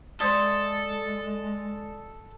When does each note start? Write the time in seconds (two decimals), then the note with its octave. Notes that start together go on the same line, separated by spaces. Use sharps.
0.20 G#3 A4 C5 D5 E5 C6 D#6 A6